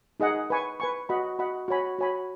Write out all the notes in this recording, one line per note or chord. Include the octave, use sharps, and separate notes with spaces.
D#4 G#4 D#5 F#5
B4 G#5 C#6
B4 G#5 C#6
F#4 D#5 F#5 B5
F#4 D#5 F#5 B5
F#4 C#5 G#5 B5
F#4 C#5 G#5 B5